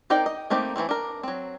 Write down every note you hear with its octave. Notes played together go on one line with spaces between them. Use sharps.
C4 D#4 A#4 D5 G5
D#5
A3 A#3 C4 D#4 G4
E3 F#3 A3 C4
D4 A#4
F#3 C4